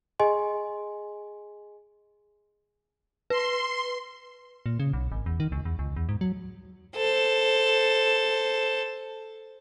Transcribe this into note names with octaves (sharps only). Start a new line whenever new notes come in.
G#4 D#5 G#5 C6
B4 C6
A#2
C#3
B1
G#1
E2
D#3
C#2
E2
C#2
E2
G#2
F#3
A4 C5